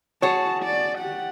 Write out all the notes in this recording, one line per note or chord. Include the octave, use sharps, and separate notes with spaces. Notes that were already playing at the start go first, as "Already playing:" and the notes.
F#4 G#4 C#5 A5
D5
G4 F#5